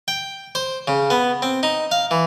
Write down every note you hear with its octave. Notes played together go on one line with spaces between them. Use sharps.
G5
C5
C#3
B3
C4
D#4
F5
E3